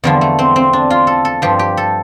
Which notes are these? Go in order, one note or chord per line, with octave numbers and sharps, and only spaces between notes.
E2 D3 F3 G3
A3
C4
C4
D4
F4
A4
A4
G2 F3 G4
G4
A4